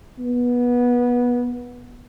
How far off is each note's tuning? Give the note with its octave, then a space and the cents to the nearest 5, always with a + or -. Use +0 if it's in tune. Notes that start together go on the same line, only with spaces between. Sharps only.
B3 -20